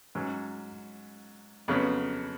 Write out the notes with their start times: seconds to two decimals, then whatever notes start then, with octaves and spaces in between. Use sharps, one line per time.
0.15 G#2 F#3 C#4
1.68 F2 C#3 F#3 B3